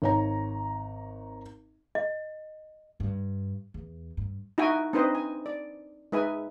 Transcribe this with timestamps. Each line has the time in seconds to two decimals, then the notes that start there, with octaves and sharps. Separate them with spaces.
0.02 G#1 C#5 A#5
1.95 D#5
3.00 G2
3.74 E2
4.17 G2
4.58 D#4 E4 F#4 E5 G5 G#5
4.93 C4 D4 D#4 B4 C5 D#5
5.15 G#5
5.46 D5
6.12 G#3 D#4 B4 E5 G#5